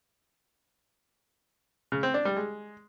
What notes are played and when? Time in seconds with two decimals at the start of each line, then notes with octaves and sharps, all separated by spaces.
1.92 C#3
2.03 C4
2.14 D4
2.25 G3
2.36 G#3